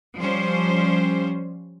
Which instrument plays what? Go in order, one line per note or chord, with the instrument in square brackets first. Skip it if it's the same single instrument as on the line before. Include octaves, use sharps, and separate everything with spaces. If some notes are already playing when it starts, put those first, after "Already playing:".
[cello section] F3 G3 C#4 C5